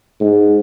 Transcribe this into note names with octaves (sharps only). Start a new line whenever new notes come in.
G#2